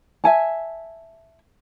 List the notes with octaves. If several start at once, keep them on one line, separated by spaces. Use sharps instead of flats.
E5 G#5 A5